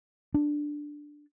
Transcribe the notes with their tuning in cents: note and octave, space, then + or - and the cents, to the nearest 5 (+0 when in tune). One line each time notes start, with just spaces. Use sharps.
D4 +5